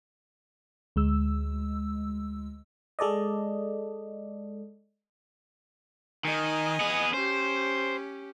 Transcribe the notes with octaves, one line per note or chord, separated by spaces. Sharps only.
D2 G#3 E6
G#3 A4 D5 D#5
D#3 D#5 G#5
B3 G#4
C#4 G4 C5